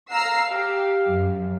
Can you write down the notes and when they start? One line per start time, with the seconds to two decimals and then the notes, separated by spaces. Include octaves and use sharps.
0.11 F5 A#5 E6 C7
0.51 G4
1.07 F#2